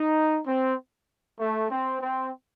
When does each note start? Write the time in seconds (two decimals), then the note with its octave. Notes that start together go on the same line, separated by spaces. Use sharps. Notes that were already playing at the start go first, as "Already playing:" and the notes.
Already playing: D#4
0.47 C4
1.40 A3
1.71 C4
2.01 C4